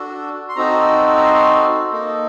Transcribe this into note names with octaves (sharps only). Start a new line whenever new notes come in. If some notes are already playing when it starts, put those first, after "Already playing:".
Already playing: D4 F#4 A4
C6
C4 D#4 F#4 A4 A#5
A#5
C6
A#3 D#4 A4